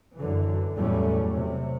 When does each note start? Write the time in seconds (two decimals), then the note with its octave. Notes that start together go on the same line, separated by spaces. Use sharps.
0.17 F#2 D3 E3
0.75 E2 A2 F#3 G3 A3 C#4
1.35 C3